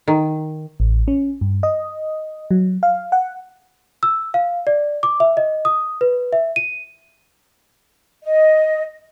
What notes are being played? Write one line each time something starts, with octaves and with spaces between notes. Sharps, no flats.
D#3
A1
C#4
G2
D#5
F#3
F5
F#5
E6
F5
D5
D6
E5
D#5
D#6
B4
E5
D#7
D#5